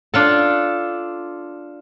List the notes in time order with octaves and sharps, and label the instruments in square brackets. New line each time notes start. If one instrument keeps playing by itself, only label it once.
[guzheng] D4 F4 A4